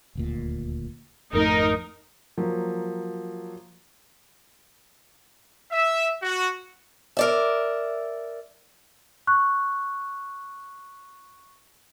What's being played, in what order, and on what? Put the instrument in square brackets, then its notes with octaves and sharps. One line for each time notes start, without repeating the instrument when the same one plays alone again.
[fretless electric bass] D#1 D2 A#2
[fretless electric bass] G#1 F2 A3 [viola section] D#4 A#4
[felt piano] F3 F#3 A#3
[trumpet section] E5
F#4
[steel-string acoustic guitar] A#4 D5 E5
[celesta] C#6 F#6